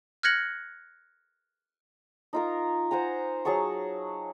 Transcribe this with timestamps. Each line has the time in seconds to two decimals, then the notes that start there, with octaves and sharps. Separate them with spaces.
0.23 F6 F#6 G#6 A#6 C#7 F#7
2.33 D#4 F4 A#4
2.91 C5 F#5 G#5 A#5
3.45 F#3 G#4 A5 C#6